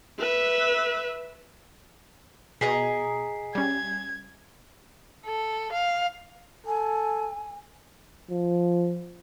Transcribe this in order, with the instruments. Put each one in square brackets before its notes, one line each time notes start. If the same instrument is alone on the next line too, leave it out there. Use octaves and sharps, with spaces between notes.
[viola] B4 E5
[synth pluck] B2 [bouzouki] G#4 D#5 A#5 [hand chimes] G#5 B6 C7
[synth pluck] G3 C#4 [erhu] G#6
[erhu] A4
F5
[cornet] A4 [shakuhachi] G#5
[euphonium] F3